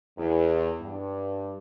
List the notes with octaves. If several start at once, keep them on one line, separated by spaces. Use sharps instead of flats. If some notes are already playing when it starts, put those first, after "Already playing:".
E2
G2